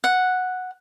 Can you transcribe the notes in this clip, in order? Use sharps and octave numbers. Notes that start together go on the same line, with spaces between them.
F#5